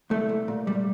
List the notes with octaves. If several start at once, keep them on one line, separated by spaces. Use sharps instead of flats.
C2 A3
C2
A#2
G3